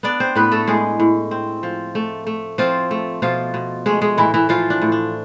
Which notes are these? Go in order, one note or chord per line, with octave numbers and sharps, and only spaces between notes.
B3 D4 D5
C4 C5
A2 B3 B4
A3 A4
A2 G#3 G#4
A2
C4
F3
A3
A3
F3 C4 F4
A3
B2 F3 F4
B2
G#3 A3 G#4
G#3 G#4
A2 E3 E4
E3 E4
E3 F3 F4
D4
A2
D4